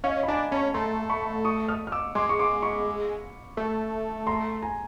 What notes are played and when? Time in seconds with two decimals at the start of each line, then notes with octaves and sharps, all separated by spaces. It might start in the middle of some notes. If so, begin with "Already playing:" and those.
0.04 C#4 D#5 F5
0.23 B5
0.28 D4 G#5 A#5
0.51 C#4 A5 B5
0.74 A3 A#5 C6
1.10 B5 C#6
1.45 C#6 D#6
1.68 D#6 F6
1.87 F6
1.92 D6 E6
2.15 G#3 C6 D6
2.29 C#6
2.39 C6 D6
2.62 B5 C#6
3.57 A3
4.27 A#5 C6
4.62 G#5 A#5